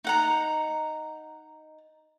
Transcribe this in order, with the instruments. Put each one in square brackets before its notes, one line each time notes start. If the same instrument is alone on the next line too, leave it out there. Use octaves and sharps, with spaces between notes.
[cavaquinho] D#4 F#5 A#5